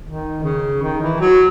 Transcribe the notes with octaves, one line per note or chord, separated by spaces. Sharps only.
D#3
C#3
D#3
E3
F#3